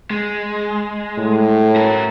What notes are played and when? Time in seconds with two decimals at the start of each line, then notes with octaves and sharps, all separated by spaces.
0.11 G#3
1.18 A2
1.76 F#4 A#4